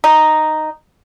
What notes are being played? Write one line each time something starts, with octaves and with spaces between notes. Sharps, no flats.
D#4